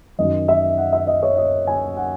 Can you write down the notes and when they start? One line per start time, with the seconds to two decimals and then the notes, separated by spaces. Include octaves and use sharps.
0.19 F#2 D#3 F#3 D#5
0.48 E5
0.78 F#5
0.93 E5
1.07 D#5
1.23 C#5
1.37 D#5
1.67 G#5
1.97 F#5